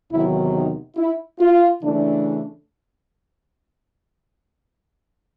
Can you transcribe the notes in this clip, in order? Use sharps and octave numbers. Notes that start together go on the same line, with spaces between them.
E2 C3 D#3 F#3 E4
D#4
E4
F4
C#3 E3 A3 D4